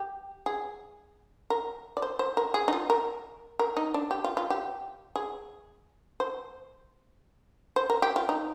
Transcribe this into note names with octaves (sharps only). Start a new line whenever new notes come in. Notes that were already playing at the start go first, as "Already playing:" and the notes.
Already playing: G4
G#4
A#4
D5
C5
C5
A#4
G#4
D#4
F4
A#4
A#4
D#4
D4
G4
F4
F4
G4
G#4
C5
C5
A#4
G4
F4
D#4